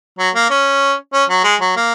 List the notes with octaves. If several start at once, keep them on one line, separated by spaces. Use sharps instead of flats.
F#3
A#3
C#4
C#4
F#3
G#3
F#3
A#3